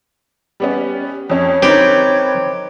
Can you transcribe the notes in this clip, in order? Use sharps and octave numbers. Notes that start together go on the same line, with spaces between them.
G3 B3 C#4
F2 C#4 C#5
C4 D#4 G4 A#4 B4